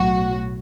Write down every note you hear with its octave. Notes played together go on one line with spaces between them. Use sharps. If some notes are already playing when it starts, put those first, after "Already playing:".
Already playing: B1 A2 F#3 F#4